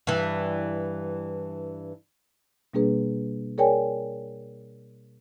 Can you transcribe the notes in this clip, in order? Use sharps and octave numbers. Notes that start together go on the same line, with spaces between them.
G2 E3
B2 G3 A#3 D4 G#4 B4
G#4 A#4 C#5 D5 G5 G#5